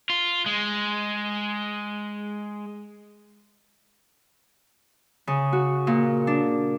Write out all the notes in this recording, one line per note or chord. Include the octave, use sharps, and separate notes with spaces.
F4
G#3
C#3
F#4
A#2
D4